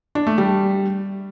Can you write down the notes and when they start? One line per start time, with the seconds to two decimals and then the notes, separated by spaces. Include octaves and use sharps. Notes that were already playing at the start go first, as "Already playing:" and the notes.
0.15 D4
0.27 A3
0.38 G3